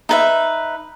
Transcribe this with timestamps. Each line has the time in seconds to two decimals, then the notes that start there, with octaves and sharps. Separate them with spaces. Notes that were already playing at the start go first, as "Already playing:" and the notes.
0.09 D#4 B4 E5